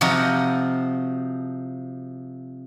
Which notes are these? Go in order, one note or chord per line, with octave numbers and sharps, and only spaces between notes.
C3 F3 D#4 F#4